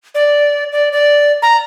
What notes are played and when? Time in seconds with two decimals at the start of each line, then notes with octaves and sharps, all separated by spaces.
0.15 D5
0.72 D5
0.92 D5
1.42 A#5